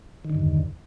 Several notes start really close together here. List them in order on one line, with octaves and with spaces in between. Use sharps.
D#3 D3 G2 E2